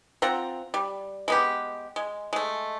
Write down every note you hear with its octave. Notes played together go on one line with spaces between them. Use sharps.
C4 F4 F#5 A#5
G3
G#3 B3 G4
G#3
G#3 A3